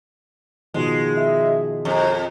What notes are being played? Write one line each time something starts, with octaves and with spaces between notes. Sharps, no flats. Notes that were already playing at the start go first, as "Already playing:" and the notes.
B2 D#3 F3 G#3
D#5 E5
F2 F#4 A#5